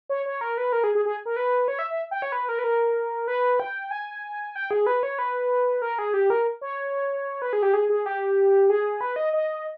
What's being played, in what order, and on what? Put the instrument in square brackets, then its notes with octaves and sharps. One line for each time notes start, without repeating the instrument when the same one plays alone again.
[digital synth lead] C#5
C#5
A#4
B4
A#4
G#4
G#4
G#4
A#4
B4
C#5
E5
E5
G5
C#5
B4
A#4
B4
A#4
B4
G5
G#5
G5
G#4
B4
C#5
B4
A#4
G#4
G4
A#4
C#5
B4
G#4
G4
G#4
G#4
G4
G#4
B4
D#5
D#5